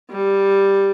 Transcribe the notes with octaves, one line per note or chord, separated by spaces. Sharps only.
G3